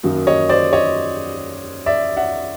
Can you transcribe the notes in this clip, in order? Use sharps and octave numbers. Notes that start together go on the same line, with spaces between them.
F#2 D#3 F#3 A#3 D#4
C#5 D#5
C5 D5
C#5 D#5
D5 E5
E5 F#5